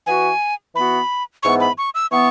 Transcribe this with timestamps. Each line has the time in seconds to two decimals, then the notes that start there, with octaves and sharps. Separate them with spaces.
0.06 E3 B3 F#4 G#5
0.74 E3 B3 F#4 B5
1.43 G#2 E3 B3 C#6
1.60 B5
1.78 C#6
1.95 E6
2.12 E3 B3 C#6